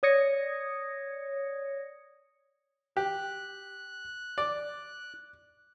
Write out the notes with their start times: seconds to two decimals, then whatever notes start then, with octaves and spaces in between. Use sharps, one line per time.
0.03 C#5 D5 D#6 G#6 A#6 C#7
2.97 G4 F#6
4.38 D5